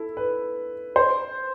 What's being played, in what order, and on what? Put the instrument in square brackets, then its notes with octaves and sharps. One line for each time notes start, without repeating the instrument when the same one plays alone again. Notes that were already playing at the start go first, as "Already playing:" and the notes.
Already playing: [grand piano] E4 A4
B4
C5